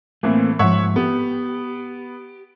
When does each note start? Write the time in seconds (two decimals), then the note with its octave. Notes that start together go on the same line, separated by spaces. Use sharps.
0.23 A2 E3 A3 A#3 C4
0.59 G#2 F3 C#5 E5 F#5
0.96 B3 G4